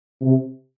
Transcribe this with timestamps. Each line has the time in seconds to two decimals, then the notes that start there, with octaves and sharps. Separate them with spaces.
0.22 C3